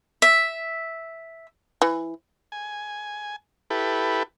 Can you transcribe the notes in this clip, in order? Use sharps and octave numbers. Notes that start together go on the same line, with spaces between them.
E5
E3
G#5
E4 G4 A4 B4